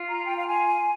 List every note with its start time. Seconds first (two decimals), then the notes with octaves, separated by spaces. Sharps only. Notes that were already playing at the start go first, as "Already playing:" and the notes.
Already playing: F4
0.09 A#5
0.25 G5
0.37 F5
0.47 G#5